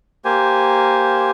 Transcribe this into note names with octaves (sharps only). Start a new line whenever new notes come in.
A#3 G4 C5 G#5